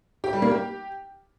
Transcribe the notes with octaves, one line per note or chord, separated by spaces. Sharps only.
G4
G3
A#3
G4